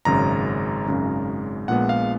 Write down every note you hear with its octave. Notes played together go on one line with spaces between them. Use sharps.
G#1 F#2 C#3 G#3 A#5
G#1 F#2 C#3 G#3
A#1 A#2 G#3 B3 F#5
F5